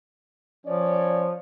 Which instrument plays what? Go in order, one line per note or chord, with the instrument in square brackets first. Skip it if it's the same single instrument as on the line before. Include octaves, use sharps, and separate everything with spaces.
[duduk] F3 [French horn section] C#4 C#5 D5